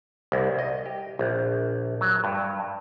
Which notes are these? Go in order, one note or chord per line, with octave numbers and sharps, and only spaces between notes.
C2
D#5
G4
A#1
F#3
G2